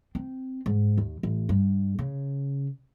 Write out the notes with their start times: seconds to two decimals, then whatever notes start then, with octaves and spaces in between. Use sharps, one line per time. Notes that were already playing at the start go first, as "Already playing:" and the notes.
0.15 C4
0.66 G#2
0.98 D#2
1.23 A1
1.49 G2
1.99 C#3